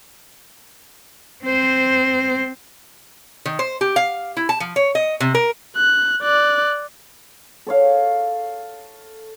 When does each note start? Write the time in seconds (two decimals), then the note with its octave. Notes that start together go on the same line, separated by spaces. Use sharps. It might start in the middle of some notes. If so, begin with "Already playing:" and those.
1.44 C4 C5
3.45 D#3
3.59 C5
3.81 G4
3.96 F5
4.37 E4
4.49 A5
4.60 F3
4.76 C#5
4.95 D#5
5.20 C3
5.35 A#4
5.76 F#6
6.23 D5 F#6
7.67 A4 C#5 F5